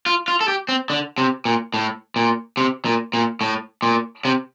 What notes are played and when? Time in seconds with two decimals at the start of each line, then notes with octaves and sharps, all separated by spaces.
0.06 F4
0.28 F4
0.41 A4
0.48 G4
0.69 C4
0.90 D3
1.18 C3
1.45 A#2
1.74 A2
2.16 A#2
2.57 C3
2.85 A#2
3.14 A#2
3.41 A2
3.82 A#2
4.25 C3